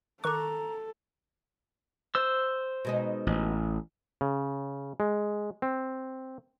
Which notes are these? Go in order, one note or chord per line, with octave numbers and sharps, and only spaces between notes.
D#3 A4 A#5 C#6 D6 F#6
C5 E6
B2 G#3 D#4
A1
C#3
G#3
C4